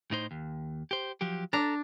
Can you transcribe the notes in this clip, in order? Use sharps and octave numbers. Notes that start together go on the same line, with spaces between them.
A2 D#4 C5
D#2
G4 C5
F3 F#3 G4
D4 A4 A#5